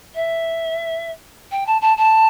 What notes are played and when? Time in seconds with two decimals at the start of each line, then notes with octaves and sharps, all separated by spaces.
0.14 E5
1.51 G5
1.66 A5
1.81 A5
1.97 A5